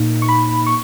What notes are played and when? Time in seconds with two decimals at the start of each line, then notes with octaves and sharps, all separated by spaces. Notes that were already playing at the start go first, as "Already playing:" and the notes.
Already playing: A#2 A#3 D#4
0.22 C#6
0.28 B5
0.66 C#6